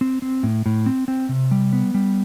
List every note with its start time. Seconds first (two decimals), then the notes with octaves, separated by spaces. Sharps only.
0.01 C4
0.22 C4
0.43 A2
0.66 A2
0.86 C4
1.08 C4
1.29 C3
1.51 G3
1.73 B3
1.94 G3